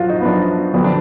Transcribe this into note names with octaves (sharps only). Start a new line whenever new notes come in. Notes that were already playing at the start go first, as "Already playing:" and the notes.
Already playing: F#2 F3 F4 F#4
D#4
B3
F#2 F3 D4
F2 D3 F#3 B3
D4